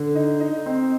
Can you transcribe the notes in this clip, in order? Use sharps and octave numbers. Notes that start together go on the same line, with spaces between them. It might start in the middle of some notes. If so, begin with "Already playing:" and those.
Already playing: D3
D#4
D#4
C4